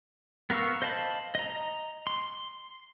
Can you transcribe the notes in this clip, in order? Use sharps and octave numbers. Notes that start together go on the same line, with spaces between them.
B3 A#4 F5 C#6 E6
C5 D#5 F5 A5 B5
D#5 A#5
C6